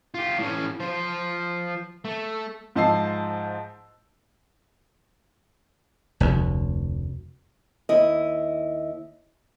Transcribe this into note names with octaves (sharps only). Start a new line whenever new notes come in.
F4 G4
A2 C#4
F3 C5
A3
G#2 F3 D#5 A5 E6 C7
F1 D2
D#2 E4 D#5